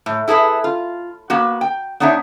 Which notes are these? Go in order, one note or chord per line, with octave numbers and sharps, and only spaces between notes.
A2
E4 G#4 A4 B4 E5
F4
A#3 B3 F#4
G5
B3 D4 D#4 C#5 E5